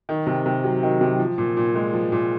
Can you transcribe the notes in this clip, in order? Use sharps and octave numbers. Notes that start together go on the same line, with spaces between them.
D#3
C3
C3
F#3
D#3
C3
F3
A#2
A#2
G#3
F3
A#2